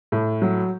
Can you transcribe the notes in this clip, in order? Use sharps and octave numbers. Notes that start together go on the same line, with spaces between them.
A2
F#3